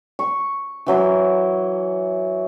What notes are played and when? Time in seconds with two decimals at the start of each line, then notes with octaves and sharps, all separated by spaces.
0.19 C#6
0.86 E3 F#3 E4 C6